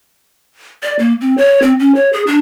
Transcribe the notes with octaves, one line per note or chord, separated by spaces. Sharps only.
D5
A#3
C4
C#5
C4
C#4
C#5
G#4
D4